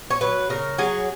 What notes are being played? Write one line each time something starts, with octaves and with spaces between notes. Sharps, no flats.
C#5
F#3 B4
C#3 A#4
F#3 G#4